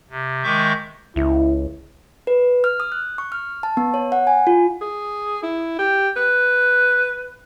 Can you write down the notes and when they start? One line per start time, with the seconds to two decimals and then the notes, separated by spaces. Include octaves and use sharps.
0.11 C3
0.44 D#3 G#3 E5 C#6 D6 G6
1.16 C#2 E4
2.27 B4
2.64 F6
2.80 D#6
2.92 F#6
3.18 C#6
3.32 F6
3.63 A5
3.77 B3
3.94 C#5
4.12 F#5
4.27 G#5
4.47 F4
4.81 G#4
5.43 E4
5.79 G4
6.16 B4